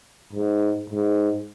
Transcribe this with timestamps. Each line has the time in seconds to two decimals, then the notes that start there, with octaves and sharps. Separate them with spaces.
0.33 G#2
0.90 G#2